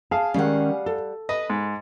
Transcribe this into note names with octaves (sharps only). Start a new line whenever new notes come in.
G#4 F5 A5
D#3 G3 G#3 C#4 F#5
A4
B4 D#5
G#2